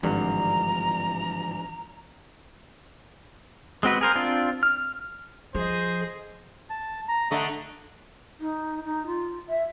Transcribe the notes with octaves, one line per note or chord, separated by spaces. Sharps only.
G#1 G2 D3 E3 F3 A#5
G#3 C4 F#4 B4
G#4 A#4 C5
C4 D4 F4
F6
F3 G#4 C5 D#5
A5
A#5
D3 A3 D#5
D#4
D#4
F4
E5